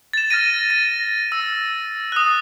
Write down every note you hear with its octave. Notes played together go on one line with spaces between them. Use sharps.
A6 E7
F6 A6 A#6 D#7
A#6
E6
D#6 F#6